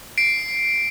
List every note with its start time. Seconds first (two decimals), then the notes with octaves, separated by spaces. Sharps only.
0.18 C7 D7